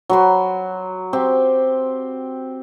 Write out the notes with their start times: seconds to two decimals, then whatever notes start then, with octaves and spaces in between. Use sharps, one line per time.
0.09 F#3 B5 C6
1.13 C4 G4